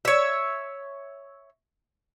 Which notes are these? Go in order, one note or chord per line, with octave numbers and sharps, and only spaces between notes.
C#5 E5